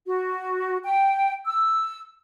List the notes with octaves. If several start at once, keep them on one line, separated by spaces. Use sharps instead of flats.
F#4
G5
E6